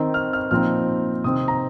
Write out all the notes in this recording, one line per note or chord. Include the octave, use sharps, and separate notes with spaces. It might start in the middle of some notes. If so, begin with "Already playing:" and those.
Already playing: D#3 C4 D#4
F6
F6
A#2 F3 C4 D#4 F6
C3 D#3 C4 D#4 D#6
D#6
A#5